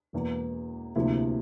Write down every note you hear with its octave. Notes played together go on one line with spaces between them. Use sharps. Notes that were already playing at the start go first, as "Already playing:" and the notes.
E1 E2 E3 A#3
D2 C3 F3 A#3 E4